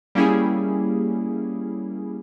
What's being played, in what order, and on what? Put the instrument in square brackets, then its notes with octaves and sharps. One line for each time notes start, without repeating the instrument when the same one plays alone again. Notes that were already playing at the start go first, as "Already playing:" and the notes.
[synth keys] G3 A#3 C#4 E4 G4 G#4